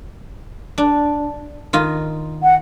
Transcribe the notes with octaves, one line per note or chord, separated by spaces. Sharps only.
D4
D#3 F4 D#5
F#5